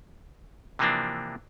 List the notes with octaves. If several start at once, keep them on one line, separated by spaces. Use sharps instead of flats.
C3 E3 F3 A#3 C4 D4